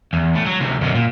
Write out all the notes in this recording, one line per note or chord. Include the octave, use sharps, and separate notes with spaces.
E2
A2
F#3
D2 C3
F#2 B2
A#2